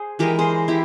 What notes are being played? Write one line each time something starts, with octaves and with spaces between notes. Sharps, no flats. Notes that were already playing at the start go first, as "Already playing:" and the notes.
Already playing: G#4 C5
E3 G#3 G4 A#4
G#4 C5
E4 G4